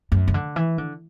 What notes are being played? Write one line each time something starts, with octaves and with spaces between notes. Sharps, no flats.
F#2
C#3
D3
E3
D3